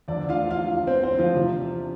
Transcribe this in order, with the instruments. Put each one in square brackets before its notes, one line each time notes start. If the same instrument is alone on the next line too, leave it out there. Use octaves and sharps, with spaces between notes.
[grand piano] E2 D3 F3 D4 D5
F4 F5
F4 F5
C4 C5
C4 C5
F3 F4
E2 C3 F3